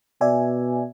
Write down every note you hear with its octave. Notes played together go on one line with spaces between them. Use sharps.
B2 D5 E5 G#5